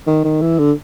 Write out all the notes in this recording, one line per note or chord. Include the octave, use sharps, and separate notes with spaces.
D#3
D#3
E3
D3